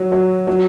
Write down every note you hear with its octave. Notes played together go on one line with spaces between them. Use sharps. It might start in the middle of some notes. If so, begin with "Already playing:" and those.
Already playing: F#3
F#3
F#3